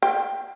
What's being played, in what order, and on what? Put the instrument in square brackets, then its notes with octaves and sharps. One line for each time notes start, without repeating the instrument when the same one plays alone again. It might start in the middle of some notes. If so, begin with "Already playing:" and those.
[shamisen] G5